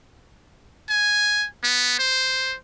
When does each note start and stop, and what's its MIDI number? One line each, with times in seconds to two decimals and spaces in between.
0.90 1.47 80
1.64 1.99 59
1.99 2.56 72